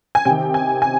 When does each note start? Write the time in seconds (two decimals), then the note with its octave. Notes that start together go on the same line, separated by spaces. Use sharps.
0.15 G#5
0.25 C3 D#3 G5
0.54 G#5
0.82 G#5